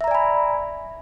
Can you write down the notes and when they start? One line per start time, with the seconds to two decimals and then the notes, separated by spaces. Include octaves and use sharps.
0.01 E5
0.04 A#5
0.08 D5
0.11 G#5
0.15 B5